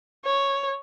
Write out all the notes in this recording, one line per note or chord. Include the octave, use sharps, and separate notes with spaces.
C#5